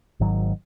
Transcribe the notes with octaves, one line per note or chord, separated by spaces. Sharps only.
G#1 G#2 D#3 F#3